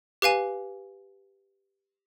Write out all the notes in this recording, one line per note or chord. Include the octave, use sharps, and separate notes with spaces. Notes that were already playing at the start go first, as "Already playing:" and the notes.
G4 B4 F5 G#5